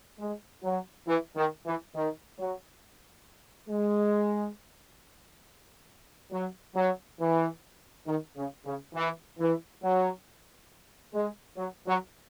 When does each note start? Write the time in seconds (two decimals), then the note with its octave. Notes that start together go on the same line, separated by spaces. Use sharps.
0.20 G#3
0.64 F#3
1.07 E3
1.36 D#3
1.66 E3
1.95 D#3
2.39 F#3
3.69 G#3
6.32 F#3
6.76 F#3
7.21 E3
8.07 D#3
8.37 C#3
8.66 C#3
8.95 E3
9.39 E3
9.83 F#3
11.14 G#3
11.57 F#3
11.87 F#3